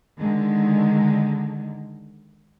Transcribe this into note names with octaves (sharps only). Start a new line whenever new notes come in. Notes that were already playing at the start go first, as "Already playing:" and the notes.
D3 D#3 G#3